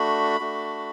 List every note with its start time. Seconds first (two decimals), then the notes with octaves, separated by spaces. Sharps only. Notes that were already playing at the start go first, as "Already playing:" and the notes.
Already playing: A3 D4 F#4 B5
0.40 A3 D4 F#4